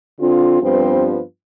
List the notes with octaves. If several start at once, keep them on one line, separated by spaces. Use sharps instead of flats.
D3 C4 F4
G2 F3 G3 B3 C4